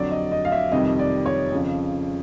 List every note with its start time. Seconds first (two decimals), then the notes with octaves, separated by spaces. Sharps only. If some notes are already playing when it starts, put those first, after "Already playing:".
Already playing: F2 D3 F#3 D5
0.11 D#5
0.32 D#5
0.45 F5
0.52 E5
0.72 F2 C3 D#3 G3 D#5
0.99 D5
1.26 C#5
1.52 F2 C#3 F3